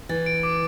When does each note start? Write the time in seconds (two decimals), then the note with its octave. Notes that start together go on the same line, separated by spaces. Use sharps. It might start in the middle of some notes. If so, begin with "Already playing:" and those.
0.09 E3 A6
0.26 D7
0.43 D6